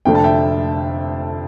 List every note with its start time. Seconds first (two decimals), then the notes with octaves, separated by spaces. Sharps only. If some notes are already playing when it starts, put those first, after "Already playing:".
0.05 F1 F2 D3 A3 D4 G5
0.15 A5
0.24 E5 G5